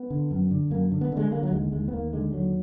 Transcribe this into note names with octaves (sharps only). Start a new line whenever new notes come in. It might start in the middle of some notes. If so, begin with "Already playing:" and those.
Already playing: B3
D3
F#2
D3
F#2 A#3
D3
B3
D3 G#3
D3 A#3
F#3
D#2 G#3
D#2 G#3
B3
D#2 A#3
D3 G#3
D#2 F#3